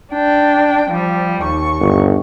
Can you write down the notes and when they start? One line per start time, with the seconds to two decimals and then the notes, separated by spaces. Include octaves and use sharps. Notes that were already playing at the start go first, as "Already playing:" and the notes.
0.13 D4 G5
0.90 F3 G3
1.43 D#2 C#6
1.80 G1